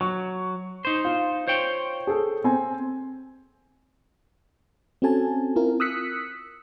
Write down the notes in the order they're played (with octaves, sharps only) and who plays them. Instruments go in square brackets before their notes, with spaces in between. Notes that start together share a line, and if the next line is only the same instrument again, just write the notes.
[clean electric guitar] F#3 [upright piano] C#6
[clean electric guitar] D#4 C5
[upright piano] F4
[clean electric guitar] C5 C#5 G5
[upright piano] G#4 A4
C4 G#5
[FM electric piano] C4 C#4 F#4 A4 G#5 A5
C4 E4 F4 A#4
D#6 E6 F#6 B6 C#7